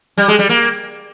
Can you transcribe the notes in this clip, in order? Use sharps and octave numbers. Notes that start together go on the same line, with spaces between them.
G3
G#3
G3
A#3